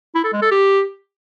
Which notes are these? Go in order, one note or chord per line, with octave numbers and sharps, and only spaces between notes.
E4
A4
G#3
A4
G4